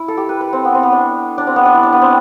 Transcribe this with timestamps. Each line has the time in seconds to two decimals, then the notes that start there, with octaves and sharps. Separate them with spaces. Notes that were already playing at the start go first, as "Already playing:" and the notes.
Already playing: E4
0.08 A4
0.17 G4
0.29 B4
0.41 B4
0.53 C4
0.65 B3
0.75 C4
0.83 B3
0.92 D4
1.38 D4
1.47 C4
1.56 B3
1.65 D4
1.74 E4
1.83 D4
1.93 B3
2.02 C4